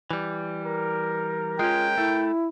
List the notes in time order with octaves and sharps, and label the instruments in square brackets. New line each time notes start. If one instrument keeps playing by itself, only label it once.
[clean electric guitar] E3 G3
[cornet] A#4
[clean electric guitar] G#3 C#4 [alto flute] F4 [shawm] G5
[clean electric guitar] A3 [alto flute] E4